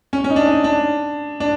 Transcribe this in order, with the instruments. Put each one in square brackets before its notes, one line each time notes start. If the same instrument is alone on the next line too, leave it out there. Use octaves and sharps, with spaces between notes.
[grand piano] C#4
C#4
D#4
D4
D#4
D4
D4